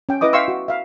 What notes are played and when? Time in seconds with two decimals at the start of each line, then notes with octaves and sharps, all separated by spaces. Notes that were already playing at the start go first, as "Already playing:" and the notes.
0.09 C#4 G5
0.21 E4 B4 D#5 D6 D#6
0.33 E5 F5 G5 C6 C#6 E6
0.48 F#4
0.68 E5 F5